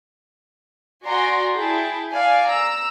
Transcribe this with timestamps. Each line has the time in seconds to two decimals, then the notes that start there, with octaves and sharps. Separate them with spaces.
1.05 F#4 D5 G#5 A#5 C6
1.54 E4 G#4 G5 A5
2.12 D5 F5 G#5
2.47 A#5 E6